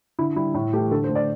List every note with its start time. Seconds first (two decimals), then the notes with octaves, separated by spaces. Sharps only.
0.19 D3 E4
0.36 G3 E4
0.54 A2 E4
0.73 E3 A3 G4
0.91 D3 A4
1.04 C5
1.09 A3
1.15 D5